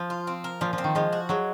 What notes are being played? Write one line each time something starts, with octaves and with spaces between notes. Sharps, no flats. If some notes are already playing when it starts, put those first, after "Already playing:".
Already playing: F3
F4
C4
A#4
A#2 F3
F3
C4
D#3
F3 G#3
F#4
F#3 G#3